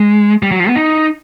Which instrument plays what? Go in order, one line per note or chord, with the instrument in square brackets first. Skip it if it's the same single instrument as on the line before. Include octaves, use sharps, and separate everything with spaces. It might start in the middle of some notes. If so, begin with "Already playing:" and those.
Already playing: [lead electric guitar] G#3
G3
F#3
F3
B3
D#4